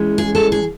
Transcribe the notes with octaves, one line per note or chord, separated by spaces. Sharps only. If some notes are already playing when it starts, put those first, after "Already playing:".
Already playing: E3 G#3 C#4
G#4
A4
G#4